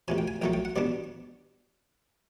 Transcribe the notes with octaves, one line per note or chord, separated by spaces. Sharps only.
D2 C3 F3 G#5
G5
G#5
A#1 A2 F#3 A3 G5
G5
F#5
B2 G3 B3 D4 D5